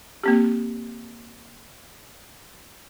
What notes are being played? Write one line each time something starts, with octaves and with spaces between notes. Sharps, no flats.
A#3 C4 G4